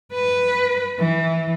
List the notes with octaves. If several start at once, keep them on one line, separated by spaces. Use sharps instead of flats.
B4
E3